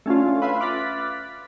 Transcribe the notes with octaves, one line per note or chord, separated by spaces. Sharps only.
A3 C#4 D4 F4
B4 E5 F5 B5 C6
D6 F6 F#6 A6 B6